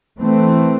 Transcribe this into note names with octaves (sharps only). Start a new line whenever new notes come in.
E3 A3 C4